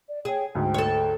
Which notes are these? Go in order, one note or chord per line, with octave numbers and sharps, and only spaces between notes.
D5
G#4 C#5 G5
D2 G#2 G5
A4 C#5